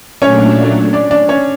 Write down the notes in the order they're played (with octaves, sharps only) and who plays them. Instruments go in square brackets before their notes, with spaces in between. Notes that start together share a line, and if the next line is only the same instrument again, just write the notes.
[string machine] A#2 F#3 A3 D4 [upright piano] C#4 C#5
[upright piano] D4 D5
D4 D5
C#4 C#5